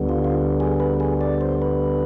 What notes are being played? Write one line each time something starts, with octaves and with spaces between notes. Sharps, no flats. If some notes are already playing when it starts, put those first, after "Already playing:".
Already playing: D2 D3 G3 B3
F4
F4
G#4
B4
G#4
D5
C5
B4